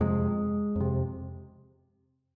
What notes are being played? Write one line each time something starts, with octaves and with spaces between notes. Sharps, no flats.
F2 C3 G#3
F2 C3